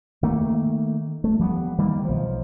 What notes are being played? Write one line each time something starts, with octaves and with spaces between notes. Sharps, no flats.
D#3 A3 A#3
A3
F3 G3 A#3 B3
D#3 G3 A#3
B1 F3